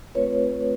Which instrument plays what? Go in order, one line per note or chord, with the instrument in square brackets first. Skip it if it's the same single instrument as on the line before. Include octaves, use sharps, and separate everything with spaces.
[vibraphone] A3 C4 F4 B4 C#5